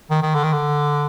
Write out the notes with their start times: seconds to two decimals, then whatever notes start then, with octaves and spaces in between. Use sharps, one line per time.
0.11 D#3
0.22 D#3
0.35 D3
0.44 D#3
0.53 D3